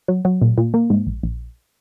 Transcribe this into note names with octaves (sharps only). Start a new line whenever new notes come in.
F#3
F#3
A#2
A#2
A#3
G#2
A#1
A#1